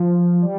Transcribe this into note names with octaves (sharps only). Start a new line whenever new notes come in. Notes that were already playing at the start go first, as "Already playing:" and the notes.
Already playing: F3
G3